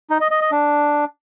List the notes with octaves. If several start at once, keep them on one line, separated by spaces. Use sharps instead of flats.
D#4
D#5
D#5
D#5
D4